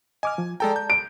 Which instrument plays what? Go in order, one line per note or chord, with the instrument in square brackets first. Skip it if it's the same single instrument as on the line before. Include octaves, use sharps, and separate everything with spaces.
[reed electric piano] D#5 D6 F6 [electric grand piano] G#5
[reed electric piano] F3
[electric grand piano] G#3 A4 G5 [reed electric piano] D5 A5 A#5
[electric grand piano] G6
[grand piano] D7